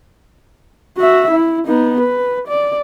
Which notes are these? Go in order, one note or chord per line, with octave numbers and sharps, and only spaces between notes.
F#4 E5
E4
B3 D#4
B4
D5